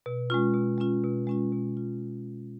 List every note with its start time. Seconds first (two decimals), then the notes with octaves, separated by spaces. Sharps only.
0.06 B2
0.30 G#3 C#4 F4
0.54 B2
0.78 G#3 C#4 F4
1.04 B2
1.27 G#3 C#4 F4
1.53 B2
1.77 F4